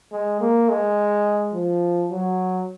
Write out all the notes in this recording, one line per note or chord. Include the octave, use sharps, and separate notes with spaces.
G#3
A#3
G#3
F3
F#3